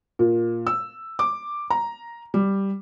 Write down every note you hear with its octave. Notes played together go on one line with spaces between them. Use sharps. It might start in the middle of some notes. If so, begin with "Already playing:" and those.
A#2
E6
D6
A#5
G3